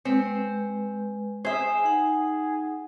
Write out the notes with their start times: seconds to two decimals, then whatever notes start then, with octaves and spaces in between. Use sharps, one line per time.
0.05 G#3 C4 B4
1.45 G#4 C5 E5
1.84 D#4 F#5